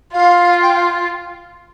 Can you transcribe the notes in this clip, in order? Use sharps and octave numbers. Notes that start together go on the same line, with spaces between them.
F4 F5
G5
F5